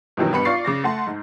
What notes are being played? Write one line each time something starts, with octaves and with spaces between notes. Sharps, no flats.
G2 B2 D#3 E3 F#3
B1 G2 B3 B5 C#7
F4 D5 C#6 A6 C7
C#3 D6 A#6
A3 F#5 A5 C6
G#2